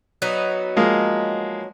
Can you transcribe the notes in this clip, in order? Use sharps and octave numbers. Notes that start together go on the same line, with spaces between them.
F#3 B3 D#4
F3 G#3 A#3